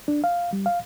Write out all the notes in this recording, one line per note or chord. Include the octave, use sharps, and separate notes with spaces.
D4
F5
G3
F5